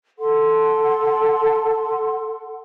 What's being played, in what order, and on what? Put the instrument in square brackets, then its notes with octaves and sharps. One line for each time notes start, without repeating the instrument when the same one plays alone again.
[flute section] A4 F#5 C6